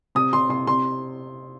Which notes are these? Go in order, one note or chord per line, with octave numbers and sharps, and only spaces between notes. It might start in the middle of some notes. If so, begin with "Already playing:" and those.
C3 D#6
C3 C6
C3 C6
C3 C6